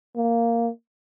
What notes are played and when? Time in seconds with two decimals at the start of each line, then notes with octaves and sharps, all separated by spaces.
0.16 A#3